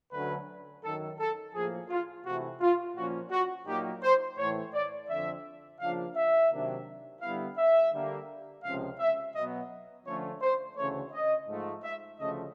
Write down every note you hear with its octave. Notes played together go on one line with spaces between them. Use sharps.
D2 D3 F#3 A3 C#4 B4
F#2 D#3 F#3 A4
A4
A2 F3 A#3 G#4
F4
C3 E3 A3 F#4
F4
A#2 F3 A#3 C#4 F#4
F#4
A#2 F#3 A#3 D#4 G4
C5
A2 E3 A3 C#5
D5
F2 D3 F3 E5
C#3 F3 A#3 D4 F4 F5
E5
C3 D#3 F#3 A#3 D4
D3 G3 B3 E4 F5
E5
D3 G3 A#3
C#2 C3 F3 G#3 C#4 F5
E5
B2 F#3 B3 D#5
D3 F3 A3 C#4 F4 C#5
C5
D2 C#3 E3 A3 C#5
D#5
G#2 F3 A3
E5
D2 C#3 F3 A3 D#5